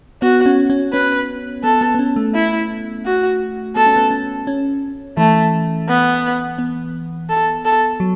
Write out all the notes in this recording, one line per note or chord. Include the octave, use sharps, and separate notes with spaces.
B3 F#4
C#4
C#4
C#4 B4
B3 A4
B3
B3
C#4
A3
E4
F#4
B3 A4
C#4
B3
C#4
C#4
E3 A3
B3
B3
A4
A4
F#3